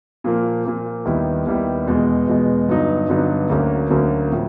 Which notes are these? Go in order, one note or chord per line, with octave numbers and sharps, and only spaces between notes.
A#2 F3 A#3
A#2 F3 A#3
D#2 D#3 G3 B3 E4
D#2 D#3 G3 B3 E4
E2 B2 G#3
E2 B2 G#3
G2 D3 F#3 B3 D#4
G2 D3 F#3 B3 D#4
D2 D3 F#3 A#3 C#4
D2 D3 F#3 A#3 C#4
A2 F3